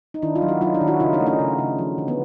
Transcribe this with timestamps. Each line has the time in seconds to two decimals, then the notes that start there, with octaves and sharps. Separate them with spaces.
0.14 D#4
0.22 D#3 D4 E4
0.36 D#4 F4
0.42 F#3
0.48 E4 F#4
0.61 F#3 D#4 F4
0.74 D4 E4
0.81 D#3
0.87 E4 F#4
1.00 C#3 D#4 F4
1.13 C#4 D#4
1.20 A3
1.27 C#4 D#4
1.40 C#3
1.59 C#3
1.79 F3
1.98 D3
2.08 B3